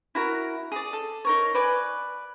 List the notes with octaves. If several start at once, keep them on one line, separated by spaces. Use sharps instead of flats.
E4 F#4 A#4
G#4 D5
A4
D#4 A#4 C#5
B4 D5 G#5